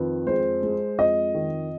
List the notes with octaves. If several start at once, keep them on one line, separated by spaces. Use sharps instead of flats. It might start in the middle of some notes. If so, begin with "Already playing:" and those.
Already playing: F2 D#3 B4
G#3 C5
G#3
F2 D#5
D#3